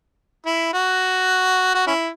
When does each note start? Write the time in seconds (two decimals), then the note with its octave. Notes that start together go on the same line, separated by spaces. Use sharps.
0.46 E4
0.74 F#4
1.74 F#4
1.87 C#4 E4